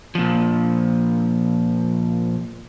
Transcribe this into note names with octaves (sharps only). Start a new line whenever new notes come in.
A#2 F3